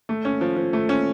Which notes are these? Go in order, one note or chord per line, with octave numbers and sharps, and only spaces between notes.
A3
C#4
F3
F3
A3
C#4